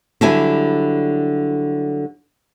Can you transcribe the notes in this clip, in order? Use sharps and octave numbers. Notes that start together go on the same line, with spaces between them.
D3 F#3 G3 E4 G#5